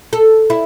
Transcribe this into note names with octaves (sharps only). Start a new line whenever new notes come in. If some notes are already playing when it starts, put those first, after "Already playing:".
A4
E4